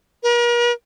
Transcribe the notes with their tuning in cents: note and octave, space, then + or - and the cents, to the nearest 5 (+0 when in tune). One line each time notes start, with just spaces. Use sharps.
A#4 +45